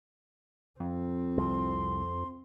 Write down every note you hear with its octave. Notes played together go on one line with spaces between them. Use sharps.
F2 C4
C2 C6